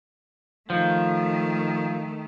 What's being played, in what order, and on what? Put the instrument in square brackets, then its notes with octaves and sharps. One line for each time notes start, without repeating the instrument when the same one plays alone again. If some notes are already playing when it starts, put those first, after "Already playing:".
[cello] D#3 A3 [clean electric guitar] F3